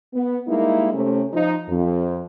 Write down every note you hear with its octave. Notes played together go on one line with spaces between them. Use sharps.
B3
G3 G#3 A#3 D#4 E4
C3 A3 C#4
F3 D#4
F2